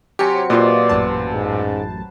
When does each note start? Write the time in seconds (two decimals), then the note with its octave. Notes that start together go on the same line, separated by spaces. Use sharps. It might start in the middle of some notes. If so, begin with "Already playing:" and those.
0.19 C3 F#3 G4 C#5 G#5 C#7
0.50 A#2 F4 B4 C5 D5 D#5
0.89 A1 F#2 A5
1.34 G#2